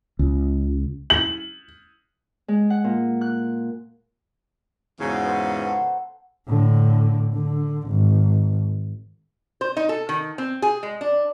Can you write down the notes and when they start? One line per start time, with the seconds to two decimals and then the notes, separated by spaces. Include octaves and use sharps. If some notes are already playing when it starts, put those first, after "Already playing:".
0.19 C#2
1.10 F#7
2.48 G#3
2.70 F#5
2.84 A#2
3.21 F#6
5.00 E2 G#2 C#3 F#4 G#5 A#5
5.24 B4 C5
5.54 B3 F#5
5.69 A4 C5
6.47 A2 D3
7.33 D3
7.89 G#1
9.61 C5
9.77 D#4
9.89 A4
10.09 D#3
10.38 C4
10.62 G#4
10.83 G#3
11.01 D4